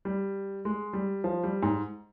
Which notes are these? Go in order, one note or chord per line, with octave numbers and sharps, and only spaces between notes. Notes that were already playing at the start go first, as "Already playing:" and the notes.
G3
G#3
G3
F3
G3
G#2